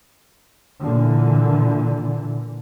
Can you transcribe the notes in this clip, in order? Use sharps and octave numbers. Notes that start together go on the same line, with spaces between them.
A#2 D3 E3